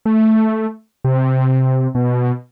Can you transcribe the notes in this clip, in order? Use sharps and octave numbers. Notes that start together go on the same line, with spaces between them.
A3
C3
B2